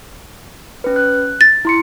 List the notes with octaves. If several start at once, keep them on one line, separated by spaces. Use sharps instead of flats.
C#4 B4
F#6
A6
E4 C6 C#7